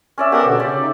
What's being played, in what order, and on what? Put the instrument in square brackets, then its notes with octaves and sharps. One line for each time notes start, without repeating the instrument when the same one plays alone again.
[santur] C#4 D5 E5
[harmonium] B3 A#4 F#5 [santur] G4 A4
[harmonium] B2 D3
[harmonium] C#3 [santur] D5
[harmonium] D#4